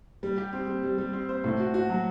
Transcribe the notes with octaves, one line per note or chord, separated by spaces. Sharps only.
G3
G4
C4
G3
G3
G3
C4
C5
A2
F#4
F#4
F#3